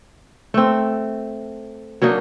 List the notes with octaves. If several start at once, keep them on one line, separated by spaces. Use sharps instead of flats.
A3 C4
F#3 A#3 D4 D#4